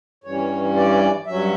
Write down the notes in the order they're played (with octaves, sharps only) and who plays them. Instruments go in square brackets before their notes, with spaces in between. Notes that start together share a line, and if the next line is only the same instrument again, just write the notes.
[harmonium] G2 E3 G3 C#4 C#5
D5
G2 F#3 C#4 E5